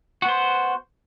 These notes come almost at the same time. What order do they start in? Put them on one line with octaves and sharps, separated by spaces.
F#4 B3 C5